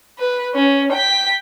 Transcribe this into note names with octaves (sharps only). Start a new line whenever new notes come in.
B4
C#4
G5 B6